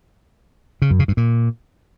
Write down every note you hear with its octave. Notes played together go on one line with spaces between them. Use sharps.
C#3
F#2
C#3
G2
A#2